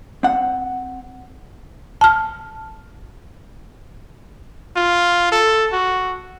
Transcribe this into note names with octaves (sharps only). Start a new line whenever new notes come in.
C4 F#5
A5 F6
F4
A4
F#4